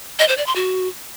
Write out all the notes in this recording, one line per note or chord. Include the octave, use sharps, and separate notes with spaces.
D#5
C5
D5
C6
F#4